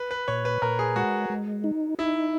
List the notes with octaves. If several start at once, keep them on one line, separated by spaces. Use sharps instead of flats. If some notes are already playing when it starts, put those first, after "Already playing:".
Already playing: B4
B4
A#2 C#5
B4
A#2 A#4
G#4
G#3 F#4
G#3
D#4
D#4 E4